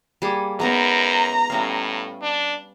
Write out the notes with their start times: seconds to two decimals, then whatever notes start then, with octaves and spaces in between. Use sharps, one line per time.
0.22 G3 A#3 G#4
0.60 F#2 G#3 B3 D#4 A#5
1.50 A2 G3 C#4 F5
2.22 D4